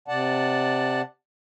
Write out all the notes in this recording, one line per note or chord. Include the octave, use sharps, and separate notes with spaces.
C3 D5 F#5 A5